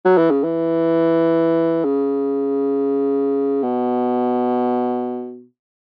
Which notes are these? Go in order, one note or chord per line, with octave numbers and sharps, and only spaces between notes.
F#3
E3
C#3
E3
C#3
B2